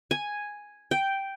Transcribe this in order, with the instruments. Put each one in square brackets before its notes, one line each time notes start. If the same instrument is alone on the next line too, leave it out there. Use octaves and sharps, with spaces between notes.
[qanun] G#5
G5